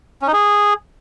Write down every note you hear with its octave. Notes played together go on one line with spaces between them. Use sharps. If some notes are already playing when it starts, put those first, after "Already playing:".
C#4
D#4
G#4